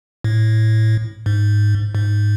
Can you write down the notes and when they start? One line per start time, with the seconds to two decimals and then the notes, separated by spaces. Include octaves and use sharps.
0.24 A2
1.26 G#2
1.95 G#2